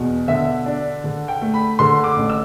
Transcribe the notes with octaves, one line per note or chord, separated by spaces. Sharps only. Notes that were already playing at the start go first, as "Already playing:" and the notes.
Already playing: E2 B2
D3 E5
D4
D3
G5
A3
B5
D3 C6
D6
A1
E6